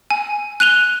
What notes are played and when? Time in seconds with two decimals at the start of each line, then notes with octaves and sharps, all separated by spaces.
0.10 G#5
0.60 F#6 D#7 F7 G7